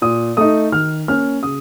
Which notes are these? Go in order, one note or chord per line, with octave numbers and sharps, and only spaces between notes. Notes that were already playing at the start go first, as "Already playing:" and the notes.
A#2 D#6
A3 D#4 D#6
D#3 F6
A#3 C#4 F6
C#3 D#6